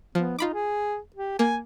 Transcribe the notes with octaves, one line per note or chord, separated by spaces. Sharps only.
F3 B3
D#4 F4 B5 D6
G#4
G4
A#3 G#5